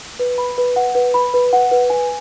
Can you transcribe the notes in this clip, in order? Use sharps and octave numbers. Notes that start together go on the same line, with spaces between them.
B4
B5
B4
F#5
B4
B5
B4
F#5
B4
G#5